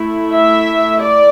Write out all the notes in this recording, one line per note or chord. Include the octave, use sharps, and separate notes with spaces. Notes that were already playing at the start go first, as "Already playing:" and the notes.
Already playing: A3 E4
E5
D5